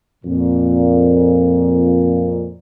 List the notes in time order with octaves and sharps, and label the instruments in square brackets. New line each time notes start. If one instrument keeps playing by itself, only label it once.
[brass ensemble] F2 A#2